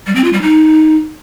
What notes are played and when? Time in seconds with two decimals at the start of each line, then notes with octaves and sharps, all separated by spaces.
0.07 G3
0.15 C4
0.24 F4
0.33 G3
0.42 D#4